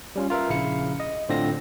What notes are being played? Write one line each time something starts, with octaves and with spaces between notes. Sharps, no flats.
G3 C#4 F4
F4 A#4 B4 E5
A#1 C#3 E4 F5 C#7
D#5
A2 D3 C4 D4 F4 A#6